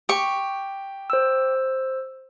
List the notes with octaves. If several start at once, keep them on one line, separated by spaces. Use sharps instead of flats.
G4 C#6
C5 E6